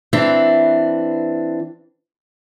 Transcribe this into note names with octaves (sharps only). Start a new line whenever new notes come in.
E3 C4 D4